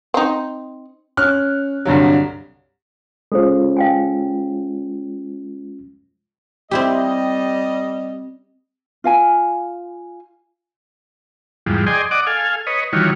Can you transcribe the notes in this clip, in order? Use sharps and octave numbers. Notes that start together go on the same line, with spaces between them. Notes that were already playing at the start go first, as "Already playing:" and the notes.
C4 D#4
C#4 F6 F#6
C2 G2 D3 F#3
G#3 C#4 F4 A4 C5
F5 G5 G#5
G3 C4 E4 G4 D#5
F4 F5 G#5
E2 G#2 F3 G3
G#4 D5 D#5 G5 G#5 C6
D5 D#5 F#5 D6
A4 F5 G#5
B4 C#5 D#5
D#3 E3 G3 F4 F#4 C#5